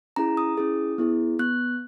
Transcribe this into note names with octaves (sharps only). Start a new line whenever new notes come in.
C#4 E4 G#4 A#5
D#6
C#4 E4 G#4
B3 E4 G#4
B3 F#6